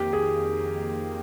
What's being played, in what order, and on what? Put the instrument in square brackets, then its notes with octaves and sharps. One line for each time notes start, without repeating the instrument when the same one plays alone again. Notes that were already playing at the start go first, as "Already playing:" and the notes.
Already playing: [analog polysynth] F2 D#3 A#3 [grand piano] G4
[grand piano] G#4